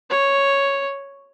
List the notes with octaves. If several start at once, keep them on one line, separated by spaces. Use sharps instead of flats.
C#5